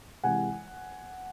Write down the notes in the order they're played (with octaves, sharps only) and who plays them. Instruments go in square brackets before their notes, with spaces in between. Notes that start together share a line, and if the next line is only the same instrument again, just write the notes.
[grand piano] C3 E3 G#3 F#5 G#5